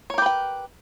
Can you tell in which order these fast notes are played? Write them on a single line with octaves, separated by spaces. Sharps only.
C#5 A#4 G4 B4 G5